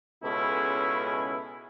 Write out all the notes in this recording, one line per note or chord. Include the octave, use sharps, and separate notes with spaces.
C#2 B2 C#4 E4 G#4 A4